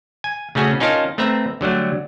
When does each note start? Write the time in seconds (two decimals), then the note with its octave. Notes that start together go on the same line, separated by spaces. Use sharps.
0.24 G#5
0.55 C#3 A3 C#4 F#4 G#4
0.80 C#4 D#4 F4 A#4 A5
1.18 A3 C4 B4 E5 A#5
1.61 D3 F#3 G3 A3